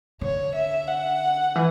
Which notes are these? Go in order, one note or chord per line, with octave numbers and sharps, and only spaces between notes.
D3 C#5
E5
F#5
E3